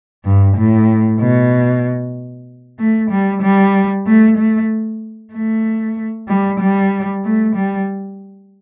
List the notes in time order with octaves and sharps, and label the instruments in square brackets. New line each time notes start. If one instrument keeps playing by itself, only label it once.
[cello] G2
A2
B2
A3
G3
G3
A3
A3
A3
G3
G3
A3
G3